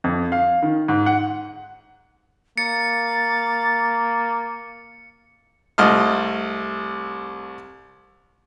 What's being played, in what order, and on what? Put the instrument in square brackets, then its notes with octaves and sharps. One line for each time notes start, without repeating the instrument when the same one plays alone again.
[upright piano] F2
F5
D#3
G#2
F#5
[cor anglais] A#3 [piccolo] A6 [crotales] C#7
[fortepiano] C2 A3 D#5 A5 F6